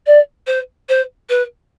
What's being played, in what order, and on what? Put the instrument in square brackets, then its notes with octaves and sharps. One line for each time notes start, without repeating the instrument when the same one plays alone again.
[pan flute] D5
C5
C5
B4